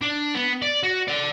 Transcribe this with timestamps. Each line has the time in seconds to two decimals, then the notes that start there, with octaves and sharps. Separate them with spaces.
0.02 D4
0.35 B3
0.62 D5
0.84 F#4
1.08 D5 F#5